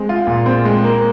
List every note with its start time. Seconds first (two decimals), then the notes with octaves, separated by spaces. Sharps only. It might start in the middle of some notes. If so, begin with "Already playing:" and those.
Already playing: G#3 C4
0.09 F4
0.27 A#2
0.46 C4
0.65 G#3
0.84 A#3